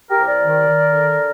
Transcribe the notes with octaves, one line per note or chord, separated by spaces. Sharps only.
G4 A#4
C2
A#4 D5
D#3
D#3
D3